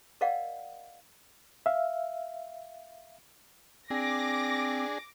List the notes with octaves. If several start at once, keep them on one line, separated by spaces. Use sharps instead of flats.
A#4 D5 D#5 F5 F#5
E5 F5
C4 D4 G#4 D6 A#6